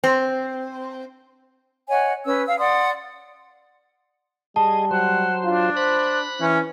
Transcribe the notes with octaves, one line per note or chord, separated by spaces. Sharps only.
C4
C#5 D#5 F#5 G#5
C#4 B4 E6
F5 E6
D5 F#5 C6 D#6
G3 G#4 D#5 A5
F#3 C5 F#5
D4 F4
C5 B5 F#6
E3 C#4